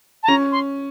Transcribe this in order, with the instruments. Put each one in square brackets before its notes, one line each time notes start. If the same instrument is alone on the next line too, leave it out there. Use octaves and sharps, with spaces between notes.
[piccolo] A5
[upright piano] C#4 [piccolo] A#5
[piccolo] C6